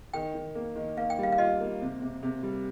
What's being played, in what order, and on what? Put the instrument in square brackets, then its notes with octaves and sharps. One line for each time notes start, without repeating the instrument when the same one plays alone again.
[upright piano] D#3 [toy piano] G5
[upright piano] D#3
A#3
D#3
[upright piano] A#3 [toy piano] F5
[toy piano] G5
[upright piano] G3 [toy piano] F5
[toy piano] F5
[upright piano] F4 [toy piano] D#5
[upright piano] A#3
C3
C3
C3
G3